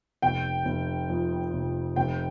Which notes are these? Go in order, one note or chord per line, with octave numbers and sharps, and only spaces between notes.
F1 G5
F1
F2
F1
F1 G5